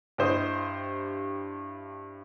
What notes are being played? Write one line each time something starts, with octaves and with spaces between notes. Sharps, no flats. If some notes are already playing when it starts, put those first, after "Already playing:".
G2 E4 G4 C5 D#5 D#6